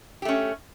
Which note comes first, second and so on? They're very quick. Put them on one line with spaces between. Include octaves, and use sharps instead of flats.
G4 A3 C#4